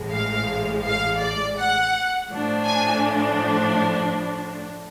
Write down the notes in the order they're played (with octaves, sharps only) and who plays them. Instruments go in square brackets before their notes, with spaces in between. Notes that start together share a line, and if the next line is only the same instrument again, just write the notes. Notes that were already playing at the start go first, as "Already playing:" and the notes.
Already playing: [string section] A1 A2 G#3
F5
F5
D5
F#5
A2 F3 A3 D4
G#5